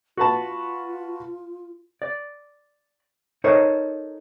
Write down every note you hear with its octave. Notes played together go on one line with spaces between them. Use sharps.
F4 F#4 B4 A5
D5
D#4 A4 A#4 C5 C#5